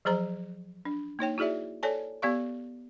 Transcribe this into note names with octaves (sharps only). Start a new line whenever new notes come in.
F3 F#3 G#4 C5 A#5
D4
A#3 D#4 C#5 G5
E4 F#4 G#4 D5 E5
A4 C#5 D5 G#5 A5
B3 G4 D5 F5 C#6